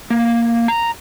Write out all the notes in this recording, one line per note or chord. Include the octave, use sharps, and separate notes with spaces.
A#3
A#5